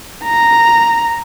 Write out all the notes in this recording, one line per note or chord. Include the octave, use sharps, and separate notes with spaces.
A#5